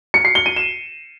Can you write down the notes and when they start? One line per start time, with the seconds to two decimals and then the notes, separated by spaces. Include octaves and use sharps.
0.14 C#7
0.25 C7
0.35 G7
0.46 D#7
0.56 E7